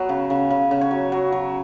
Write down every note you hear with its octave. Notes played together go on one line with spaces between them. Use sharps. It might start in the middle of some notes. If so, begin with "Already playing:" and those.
Already playing: F#3 B3 B4 C#5
C#3
C#3
C#3
C#3
C#5
F#3
F#3
F#3